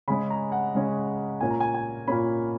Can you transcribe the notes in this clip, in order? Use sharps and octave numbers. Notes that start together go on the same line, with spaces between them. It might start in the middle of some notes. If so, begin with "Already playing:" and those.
C#3 G#3 C#4 B5
A#5
F#5
C#3 G#3 C#4
A#2 A#3 C#4 G#5
A#5
G#5
G#5
A#2 A#3 C#4 B5